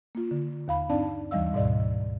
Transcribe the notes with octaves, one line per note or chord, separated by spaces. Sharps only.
A#3 F4
D3
D#2 F5 B5
G2 C4 D4 D#4 D5 A5
D#2 E3 G3 D#5 F5 E6
D2 G#2 B2 D5 D#5